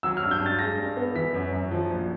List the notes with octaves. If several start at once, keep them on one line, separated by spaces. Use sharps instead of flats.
F#3 E6
F6
G2
G6
G2
A6
G#3 A#6
G2
B3
E3 B6
F#2
F#2
F3
A#1